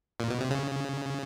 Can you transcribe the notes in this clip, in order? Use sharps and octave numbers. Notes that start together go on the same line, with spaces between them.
A#2
B2
C3
C#3